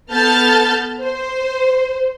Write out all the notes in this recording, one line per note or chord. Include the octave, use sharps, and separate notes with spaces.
B3 A4 A5 F6 G6 A6
C5